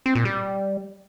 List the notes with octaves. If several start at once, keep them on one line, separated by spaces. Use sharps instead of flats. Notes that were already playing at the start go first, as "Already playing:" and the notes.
C4
A#2
G3